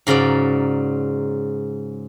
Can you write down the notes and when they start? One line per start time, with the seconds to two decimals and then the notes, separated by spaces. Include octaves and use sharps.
0.07 G#2 C#3 F#3 A#4 D5